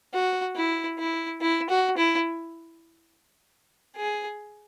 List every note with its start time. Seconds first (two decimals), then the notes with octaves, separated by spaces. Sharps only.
0.13 F#4
0.56 E4
0.98 E4
1.41 E4
1.69 F#4
1.97 E4
3.96 G#4